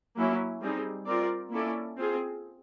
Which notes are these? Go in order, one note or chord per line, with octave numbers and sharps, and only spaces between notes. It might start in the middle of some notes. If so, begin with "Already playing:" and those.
F#3 A#3 C#4 E4
G3 C4 D#4 G#4
C4 F4 A#4 D5
A#3 C#4 E4 A4 D5
C4 F4 G#4